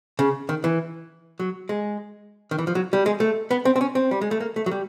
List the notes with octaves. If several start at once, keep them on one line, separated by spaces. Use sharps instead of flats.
C#3
D#3
E3
F#3
G#3
D#3
E3
F3
F#3
G3
G#3
A3
B3
C4
C4
C#4
C4
G3
G#3
A3
A#3
A3
F#3
G3